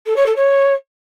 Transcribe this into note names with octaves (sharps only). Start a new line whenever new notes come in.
A4
C#5
A4
C#5